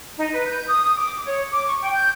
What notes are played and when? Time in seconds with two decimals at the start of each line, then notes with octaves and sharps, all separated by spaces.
0.18 D#4
0.33 B4
0.47 G6
0.68 D#6
0.96 D6
1.27 C#5
1.52 D6
1.66 C#6
1.81 G5
1.94 G6